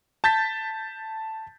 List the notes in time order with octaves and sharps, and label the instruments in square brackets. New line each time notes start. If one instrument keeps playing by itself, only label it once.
[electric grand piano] A5 G6 A6 B6